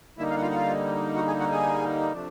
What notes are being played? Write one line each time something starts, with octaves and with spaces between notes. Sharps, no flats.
D3 G3 A#3 D#4 E4 E5
F4 F5
F#5
F4 F5
F#5
F4 F5
F#4 F#5
G#4 G#5
F#4 F#5
G#4 G#5
C3 F3 A3 D4